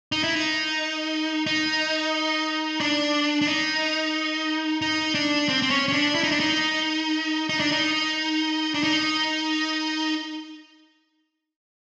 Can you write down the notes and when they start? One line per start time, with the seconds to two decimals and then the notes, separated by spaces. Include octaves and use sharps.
0.12 D#4
0.24 E4
0.36 D#4
1.46 D#4
2.80 D4
3.42 D4
3.47 D#4
4.82 D#4
5.15 D4
5.49 C4
5.62 C4
5.70 C#4
5.88 C#4
5.93 D4
6.15 E4
6.24 D#4
6.32 D4
6.40 D#4
7.49 D#4
7.60 D4
7.71 D#4
8.74 D4
8.83 D#4